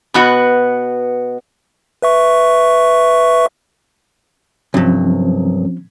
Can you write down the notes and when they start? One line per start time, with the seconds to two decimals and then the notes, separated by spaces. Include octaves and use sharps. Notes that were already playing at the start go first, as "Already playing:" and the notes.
0.14 B2 B3 F#4
2.02 B4 E5 C#6
4.74 C2 G2 F3 F#3 C4 C#4